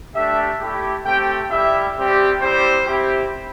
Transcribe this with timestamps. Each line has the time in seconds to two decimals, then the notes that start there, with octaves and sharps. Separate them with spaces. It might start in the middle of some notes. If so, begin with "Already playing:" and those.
0.15 A3 D4 G4 E5
0.60 A3 E4 G4
1.06 A3 C4 G4 G5
1.51 G3 E4 G4 E5
1.97 G3 C4 G4
2.42 G3 C4 E4 G4 C5
2.87 C4 E4 G4